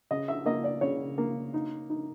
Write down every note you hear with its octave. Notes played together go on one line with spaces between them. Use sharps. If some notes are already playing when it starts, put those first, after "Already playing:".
C#3 D#5
E5
A#3 D#5
D5
C#3 C#5
A#3
D#4
D#4